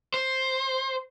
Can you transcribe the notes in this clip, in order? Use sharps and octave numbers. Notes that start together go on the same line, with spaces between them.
C5